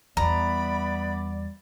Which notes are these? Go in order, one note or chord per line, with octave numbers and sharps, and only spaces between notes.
E2 G3 B3 D5 E5 A#5 B5